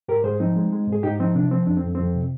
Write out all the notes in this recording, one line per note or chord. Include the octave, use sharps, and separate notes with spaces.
G#2 G4 A#4
G#2 G#4 C5
F3 C4 D#4
G#3
G#3
G#2 G#4
G#2 D#4 G4
F3 C4 D#4
C3 D4
F3 C4
F2 D4
C4
F2
F2 C4
C3